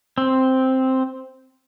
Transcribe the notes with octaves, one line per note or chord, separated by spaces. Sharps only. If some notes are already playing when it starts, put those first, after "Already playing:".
C4